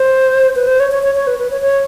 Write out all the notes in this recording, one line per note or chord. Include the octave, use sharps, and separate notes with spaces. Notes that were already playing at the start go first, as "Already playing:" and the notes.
Already playing: C5
B4
C5
C#5
C#5
C#5
C#5
B4
B4
C#5
C#5